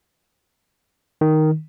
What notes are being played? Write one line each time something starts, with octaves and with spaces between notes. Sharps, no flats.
D#3